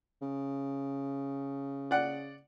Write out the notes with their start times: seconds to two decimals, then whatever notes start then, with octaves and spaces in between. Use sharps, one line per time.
0.22 C#3
1.91 D5 F#5